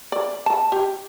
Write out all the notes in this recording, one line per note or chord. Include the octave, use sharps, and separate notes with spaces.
D5
A5
G4